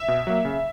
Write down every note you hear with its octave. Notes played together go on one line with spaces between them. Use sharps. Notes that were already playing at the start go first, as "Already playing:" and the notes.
Already playing: E5
B2
F#3 A#3
C#3